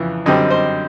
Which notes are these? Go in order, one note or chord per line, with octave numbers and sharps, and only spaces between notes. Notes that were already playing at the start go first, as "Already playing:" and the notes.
Already playing: F2 C#3 E3
F#2 D3 G3 C4 D#5
C5